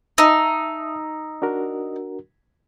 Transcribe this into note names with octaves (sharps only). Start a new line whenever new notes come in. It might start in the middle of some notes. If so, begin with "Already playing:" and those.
D#4 E5 A5 A#5 E6
D4 F#4 A#4